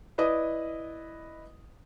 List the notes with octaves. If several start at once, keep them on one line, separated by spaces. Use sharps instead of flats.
E4 B4 D5 D#5 D#6